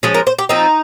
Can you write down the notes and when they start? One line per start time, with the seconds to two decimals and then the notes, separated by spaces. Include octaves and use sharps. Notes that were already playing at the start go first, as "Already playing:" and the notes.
0.03 F3 G#3 C#4 G#4
0.14 A#4
0.27 C5
0.39 G4
0.49 F3 C4 D#4